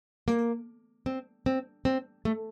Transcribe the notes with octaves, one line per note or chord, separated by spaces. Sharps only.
A#3
C4
C4
C4
A3